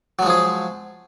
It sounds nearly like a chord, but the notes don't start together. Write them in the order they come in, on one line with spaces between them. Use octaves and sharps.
F#3 G#3 F3 G#4